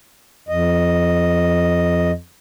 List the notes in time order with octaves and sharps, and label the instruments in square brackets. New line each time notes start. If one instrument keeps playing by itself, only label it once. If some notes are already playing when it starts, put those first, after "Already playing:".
[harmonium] F2 D#5